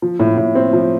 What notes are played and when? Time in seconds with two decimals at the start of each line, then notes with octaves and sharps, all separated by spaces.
0.02 F3
0.19 A2
0.37 A2
0.55 C4
0.73 F3